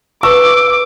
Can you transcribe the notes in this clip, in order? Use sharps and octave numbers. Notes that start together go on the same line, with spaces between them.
B4 C#6 D6 E6